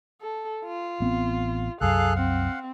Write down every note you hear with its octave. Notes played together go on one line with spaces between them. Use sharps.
A4
F4
A1 B3 C4
C2 F#2 G#4 A4 F5 F#6
C4 F5 F#5